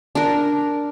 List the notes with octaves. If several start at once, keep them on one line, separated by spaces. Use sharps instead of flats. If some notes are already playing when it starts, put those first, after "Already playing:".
D4 A#4